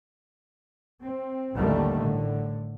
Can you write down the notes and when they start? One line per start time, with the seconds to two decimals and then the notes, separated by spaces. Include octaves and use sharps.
1.02 C4
1.56 A1 D#2 D3 D#3 G3 A3
1.98 A2 D3